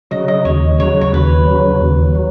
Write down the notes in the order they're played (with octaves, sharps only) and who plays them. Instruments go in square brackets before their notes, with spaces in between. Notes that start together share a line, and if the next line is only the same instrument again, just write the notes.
[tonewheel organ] C#3 F#3 [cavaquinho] D#5
[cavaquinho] D#5
[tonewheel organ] D#2 [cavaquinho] C#5
[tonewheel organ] C#3 F#3 [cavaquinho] C#5
[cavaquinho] C#5
[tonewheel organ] D#2 [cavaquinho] B4
[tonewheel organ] C#3 F#3
D#2
F#3